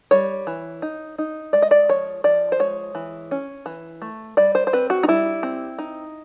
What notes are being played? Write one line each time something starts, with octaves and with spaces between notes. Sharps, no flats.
G3 C#5
E3
D#4
D#4
G#3 D5
D#5
D5
F3 C#5
F3 D5
C5
G#3 C#5
E3
C#4
E3
A3
G3 D5
C5
C5
C4 B4
F#4
D#4
G3 E4
C4
D#4